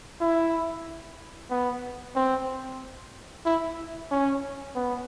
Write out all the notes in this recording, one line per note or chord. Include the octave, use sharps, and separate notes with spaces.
E4
B3
C4
E4
C#4
B3